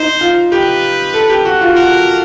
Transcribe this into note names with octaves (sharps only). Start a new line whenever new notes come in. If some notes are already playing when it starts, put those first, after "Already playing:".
Already playing: D#4 C5
F4
G4 B4
A4
G4
F#4
F4
F#4 A#4